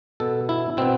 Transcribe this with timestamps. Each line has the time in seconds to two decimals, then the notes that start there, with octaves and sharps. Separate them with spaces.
0.20 B2 B3 A4
0.49 E4
0.77 B2 B3 C4